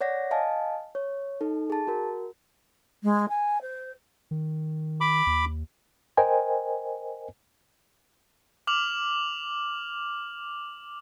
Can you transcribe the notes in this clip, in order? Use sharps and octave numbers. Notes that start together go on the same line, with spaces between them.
C#5 D5 F#5 A#6
D#5 F5 G#5 A5
C#5
D#4 A4
G#4 A5
F#4 A#4
G#3
G#5
C5
D#3
B5 D6
D#2
A#4 C5 D#5 G5 G#5
D6 F6 F7 F#7